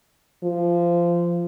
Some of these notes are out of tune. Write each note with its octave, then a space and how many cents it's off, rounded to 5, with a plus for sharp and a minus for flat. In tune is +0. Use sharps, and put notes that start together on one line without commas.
F3 -20